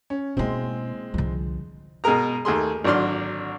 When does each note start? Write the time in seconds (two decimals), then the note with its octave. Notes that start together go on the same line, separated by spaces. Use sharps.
0.10 C#4
0.37 B2 G#3 A#3 C4 E4
1.14 C2 D3 F3
2.04 B2 G#3 G#4 A#4 A#5
2.45 D#2 A3 G#4 C6
2.84 G#1 D3 F#3 D5 C6 F6